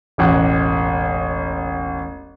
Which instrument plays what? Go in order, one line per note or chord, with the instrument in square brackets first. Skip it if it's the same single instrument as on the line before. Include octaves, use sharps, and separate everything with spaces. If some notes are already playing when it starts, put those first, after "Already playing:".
[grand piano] E1 A1 F#5